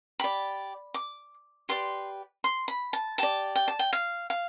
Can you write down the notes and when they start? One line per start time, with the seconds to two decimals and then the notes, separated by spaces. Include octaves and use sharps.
0.20 G4 D5 B5
0.94 D6
1.69 G4 B4 D5 C6
2.44 C6
2.68 B5
2.93 A5
3.18 G4 D5 A5
3.55 G5
3.68 A5
3.79 G5
3.93 F5
4.30 F5